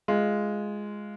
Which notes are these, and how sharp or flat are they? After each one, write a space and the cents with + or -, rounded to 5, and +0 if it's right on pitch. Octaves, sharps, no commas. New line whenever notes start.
G#3 +0 F4 -10